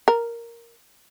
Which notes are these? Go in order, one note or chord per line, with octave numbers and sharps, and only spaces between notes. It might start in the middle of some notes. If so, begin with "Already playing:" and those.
A#4